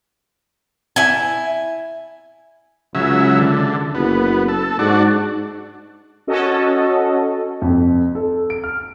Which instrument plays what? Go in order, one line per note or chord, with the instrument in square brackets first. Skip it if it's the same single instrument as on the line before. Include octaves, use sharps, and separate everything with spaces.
[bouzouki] E4 G#5
[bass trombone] C#2 [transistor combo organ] C#3 F#3 E5
[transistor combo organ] D3
[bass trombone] F#1 [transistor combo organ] B3
[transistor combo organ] A4
[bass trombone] G#2 [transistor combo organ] D4 F#4
[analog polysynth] C#4 F#4 A4 D#5
[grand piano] F2
A4
D7
F6